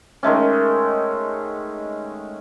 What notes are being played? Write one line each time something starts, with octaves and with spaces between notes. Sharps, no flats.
D#3 G#3 A3 C#4